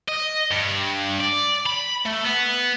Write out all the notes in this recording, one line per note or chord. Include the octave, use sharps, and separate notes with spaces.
D#5
G2
D5
B5
A3
B3